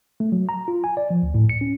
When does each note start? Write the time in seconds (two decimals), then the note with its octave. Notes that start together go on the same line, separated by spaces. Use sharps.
0.20 A3
0.32 F#3
0.49 A#5
0.68 F4
0.84 G#5
0.97 D5
1.10 F3
1.23 D2
1.34 A2
1.49 C#7
1.61 C#4